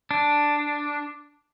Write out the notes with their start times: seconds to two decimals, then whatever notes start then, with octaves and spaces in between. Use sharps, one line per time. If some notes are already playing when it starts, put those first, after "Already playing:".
0.11 D4